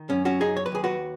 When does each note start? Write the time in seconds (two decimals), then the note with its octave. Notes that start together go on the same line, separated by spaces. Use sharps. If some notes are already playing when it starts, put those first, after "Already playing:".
Already playing: D#3
0.10 F#2 C#4
0.25 C#4 F#4
0.40 F#3 D#4 G#4
0.57 C#5
0.66 B4
0.72 D#2 G#4
0.84 F#4 B4